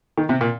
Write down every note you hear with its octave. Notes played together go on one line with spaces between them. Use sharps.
D#3
C3
A#2